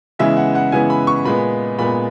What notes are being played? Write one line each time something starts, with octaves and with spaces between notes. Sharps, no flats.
C#3 E3 G#3 B3 E5
F#5
F#5
C#3 E3 G#3 B3 G#5
B5
C#6
A#2 G#3 B3 B5
A#2 G#3 B3 B5